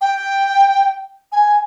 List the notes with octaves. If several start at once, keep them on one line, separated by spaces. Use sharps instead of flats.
G5
G#5